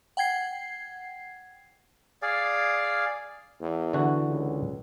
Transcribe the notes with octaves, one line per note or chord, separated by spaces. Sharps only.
F#5 G5 G#6 C7
G#4 D5 F5
E2
D3 E3 F#4
C#2